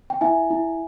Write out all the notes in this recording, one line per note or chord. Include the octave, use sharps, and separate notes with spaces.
G5
E4 E5 G#5
E4